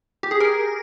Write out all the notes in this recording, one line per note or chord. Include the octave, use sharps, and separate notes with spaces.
G4
G#4
A#4